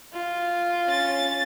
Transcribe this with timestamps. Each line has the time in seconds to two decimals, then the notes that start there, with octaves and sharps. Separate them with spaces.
0.14 F4
0.87 C#4 A6